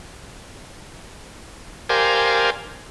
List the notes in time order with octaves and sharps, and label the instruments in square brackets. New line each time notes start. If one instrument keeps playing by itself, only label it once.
[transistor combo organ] G4 A#4 C5 D5 F5 G#5